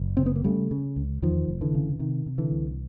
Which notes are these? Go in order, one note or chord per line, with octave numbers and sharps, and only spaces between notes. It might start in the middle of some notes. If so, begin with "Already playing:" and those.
Already playing: F#1
C#3 C4
B3
A#3
C#3 G3 A3
C#3
C#2
E2 D#3 F3
F1
D3 E3
C#3
C3 D#3
C3
D3 E3
C2